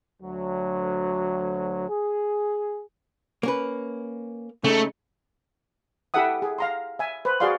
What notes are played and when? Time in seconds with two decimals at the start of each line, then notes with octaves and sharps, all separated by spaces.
0.22 D2 F#3
1.89 G#4
3.43 A#3 C#4 B4
4.64 C#3 A3 D#4
6.14 E4 G4 A4 E5 F#5 D#6
6.42 G#4
6.58 F5 A#5 C6
6.99 E5 G#5
7.25 B4 C5
7.40 F#4 G#4 D5 F5 C6